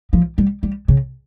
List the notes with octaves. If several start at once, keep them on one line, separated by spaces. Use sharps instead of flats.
F3
G3
G3
C#3